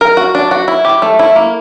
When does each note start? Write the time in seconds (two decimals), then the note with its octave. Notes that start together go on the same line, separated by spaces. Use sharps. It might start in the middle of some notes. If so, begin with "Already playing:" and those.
0.01 A#4
0.17 F#4
0.35 D4
0.51 F#4
0.68 E4
0.85 G4
1.02 A3
1.19 E4
1.36 A#3